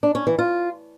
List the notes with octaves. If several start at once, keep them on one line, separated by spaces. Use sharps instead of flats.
D4
C#4
E3
F4